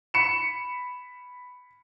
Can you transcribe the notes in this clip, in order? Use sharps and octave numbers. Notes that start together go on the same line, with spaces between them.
B5 C#7 E7